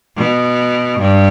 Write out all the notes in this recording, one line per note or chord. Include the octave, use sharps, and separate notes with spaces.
B2
G2